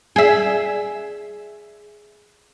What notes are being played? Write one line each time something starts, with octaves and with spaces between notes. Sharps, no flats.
G#4 E5